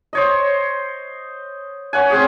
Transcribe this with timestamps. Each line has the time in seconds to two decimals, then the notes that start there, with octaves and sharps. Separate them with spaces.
0.13 C5 C#5 D#5
1.93 C#5 F#5 G#5
2.10 C4 C#4 G4 G#4